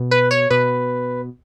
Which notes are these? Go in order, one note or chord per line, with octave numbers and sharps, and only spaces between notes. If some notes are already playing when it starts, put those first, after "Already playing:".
Already playing: B2
B4
C#5
B2 B4